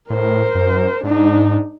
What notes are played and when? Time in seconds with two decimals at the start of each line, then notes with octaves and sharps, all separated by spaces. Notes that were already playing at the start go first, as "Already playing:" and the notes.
0.10 A2 A#4 C5
0.55 F#2
1.04 G#2 D4 D#4